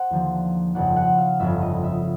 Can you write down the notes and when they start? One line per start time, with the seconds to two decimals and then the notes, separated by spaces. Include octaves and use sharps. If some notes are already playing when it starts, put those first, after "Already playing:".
Already playing: C5 F#5
0.11 D#2 D3 F3 A#3
0.75 G1 F2 C#3 F#5
0.96 F#5
1.18 F5
1.40 G1 F2 C#3 E5
1.61 D#5
1.83 E5